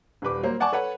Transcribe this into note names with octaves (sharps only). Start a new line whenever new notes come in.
D#1 G3 B4 D6
F#3 A#3 C5
D5 F#5 G#5 A5 C#6 D6
A4 B4 C#5 F#5